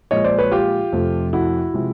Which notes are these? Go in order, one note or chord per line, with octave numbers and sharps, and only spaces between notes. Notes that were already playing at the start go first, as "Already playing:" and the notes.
A#2 F3 G#3 C#5 D#5
C5 D5
B4 C#5
F4 G4
F2 C3 F3 A3
E4 F#4
C3 F3 G#3